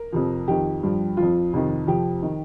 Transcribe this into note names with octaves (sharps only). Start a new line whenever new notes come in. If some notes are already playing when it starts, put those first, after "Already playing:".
Already playing: A#4
F2 C3 F3
F2 D#3 G4
G2 F3
F2 F3 F4
F2 C3 D#3
F2 C3 F3 G4
D#3